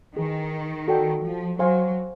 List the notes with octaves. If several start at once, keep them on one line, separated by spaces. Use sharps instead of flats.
D#3 E4 G#4 B4
F#4 A4 D5 G5
F3
F#3 C5 F5 G#5 C6